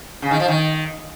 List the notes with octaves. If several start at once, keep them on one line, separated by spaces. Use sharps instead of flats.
C#3
D#3
F3
D#3